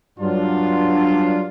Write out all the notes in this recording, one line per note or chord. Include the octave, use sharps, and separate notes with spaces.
G2 F#3 D4 F4